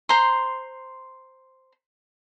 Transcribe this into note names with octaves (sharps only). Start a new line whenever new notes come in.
C5 A#5 C6